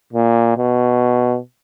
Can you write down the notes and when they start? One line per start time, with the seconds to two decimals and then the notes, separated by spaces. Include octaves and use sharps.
0.13 A#2
0.58 B2